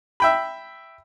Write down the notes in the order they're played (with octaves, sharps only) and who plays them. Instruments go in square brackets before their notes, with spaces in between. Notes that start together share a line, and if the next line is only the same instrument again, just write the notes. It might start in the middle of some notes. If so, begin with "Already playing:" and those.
[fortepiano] E5 G5 B5